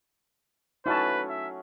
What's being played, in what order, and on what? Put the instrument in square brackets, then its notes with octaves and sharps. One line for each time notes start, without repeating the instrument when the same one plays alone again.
[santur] F#3 A3 C#4 [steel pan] D#4 E4 A5 [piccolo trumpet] B4
[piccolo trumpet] E5